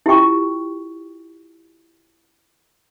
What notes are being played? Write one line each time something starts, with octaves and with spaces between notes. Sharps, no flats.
E4 F4 G4 G5 C#6